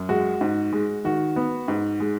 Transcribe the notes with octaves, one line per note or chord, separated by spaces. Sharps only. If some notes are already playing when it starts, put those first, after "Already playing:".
Already playing: F#2
G#3 F#4
G#2
G#3
D#3 F#4
B3
G#2
G#3